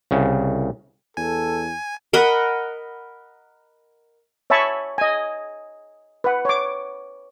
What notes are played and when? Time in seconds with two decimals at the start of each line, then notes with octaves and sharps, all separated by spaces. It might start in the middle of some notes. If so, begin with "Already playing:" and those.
0.11 C2 C#3
1.17 E2 A4 G#5
2.13 A#4 D#5 F#5 B5
4.50 C#5 E5 G#5 A5 B5 C#6
4.98 D#5 G#5
6.24 B4 F#5
6.45 C#5 D6